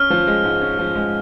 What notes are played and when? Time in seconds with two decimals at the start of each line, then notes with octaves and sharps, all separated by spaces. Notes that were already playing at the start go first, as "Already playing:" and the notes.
Already playing: C#4 F6
0.10 F3
0.27 G#3
0.44 G#2
0.61 C#4
0.79 F3
0.95 G#3